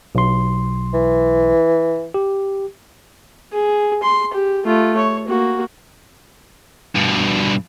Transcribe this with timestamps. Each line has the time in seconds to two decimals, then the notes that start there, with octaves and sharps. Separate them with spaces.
0.15 B1 C6
0.94 E3
2.14 G4
3.52 G#4
4.03 C6
4.33 G4
4.64 A3 F4
4.97 C#5
5.28 A#3 F#4
6.95 G2 B2